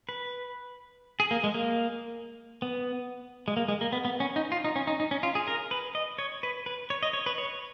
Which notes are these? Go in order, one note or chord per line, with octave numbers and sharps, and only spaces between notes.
B4
G#4
A#3
G#3
A#3
B3
G#3
A#3
G#3
A#3
B3
B3
C#4
D#4
F4
D#4
C#4
D#4
D#4
C#4
F4
G#4
A#4
B4
D#5
C#5
B4
B4
C#5
D#5
C#5
B4
C#5